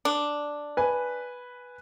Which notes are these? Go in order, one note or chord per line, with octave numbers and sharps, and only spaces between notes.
D4
B4 G#5